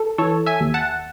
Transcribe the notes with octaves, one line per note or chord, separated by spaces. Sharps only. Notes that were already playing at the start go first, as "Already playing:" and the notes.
Already playing: A4
E3 A4 C#5
E5 G#5
D#2
F#5 A5